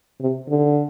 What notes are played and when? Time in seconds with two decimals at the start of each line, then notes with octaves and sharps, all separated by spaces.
0.21 C3
0.48 D3